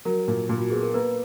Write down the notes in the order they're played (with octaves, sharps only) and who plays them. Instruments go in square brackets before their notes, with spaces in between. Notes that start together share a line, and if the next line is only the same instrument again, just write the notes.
[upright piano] F#3 [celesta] A#4
[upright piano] A#2
A#2
[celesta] F#4
[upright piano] B3 [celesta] G#4
[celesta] A#4
[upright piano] A#3 [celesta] B4